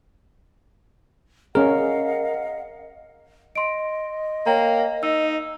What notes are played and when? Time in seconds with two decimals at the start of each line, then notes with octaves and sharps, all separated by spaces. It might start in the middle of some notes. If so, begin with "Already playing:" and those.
1.55 C#4 G#4 A#4 D#5 F5 F#5
3.56 D#5 C6 D7
4.46 A#3 C#5 G5 A#5
5.03 D#4 E6